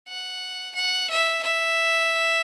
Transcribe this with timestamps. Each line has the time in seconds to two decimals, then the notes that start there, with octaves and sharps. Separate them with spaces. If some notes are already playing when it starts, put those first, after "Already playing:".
0.09 F#5
0.76 F#5
1.10 E5
1.43 E5